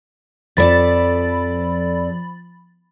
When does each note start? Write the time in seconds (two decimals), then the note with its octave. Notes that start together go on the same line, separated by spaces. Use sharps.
0.57 F2 F3 A4 D5 B5 A6